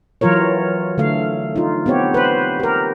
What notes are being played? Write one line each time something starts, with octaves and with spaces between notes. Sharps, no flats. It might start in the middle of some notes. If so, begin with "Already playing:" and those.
E3 F#3 F4 A#4 C#5
D3 A3 F5
D#4 F4
B3 C4 G4 C#5
B4 C5
G4 A#4